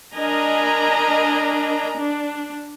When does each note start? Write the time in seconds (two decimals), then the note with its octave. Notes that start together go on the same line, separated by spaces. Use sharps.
0.15 D4 A#4 D#5 G#5 A#5 B5
1.98 D4